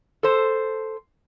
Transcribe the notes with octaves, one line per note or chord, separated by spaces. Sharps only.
A4 C5